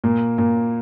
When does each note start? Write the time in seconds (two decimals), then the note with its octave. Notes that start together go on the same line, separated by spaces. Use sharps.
0.04 A#2 A#3
0.38 A#2 A#3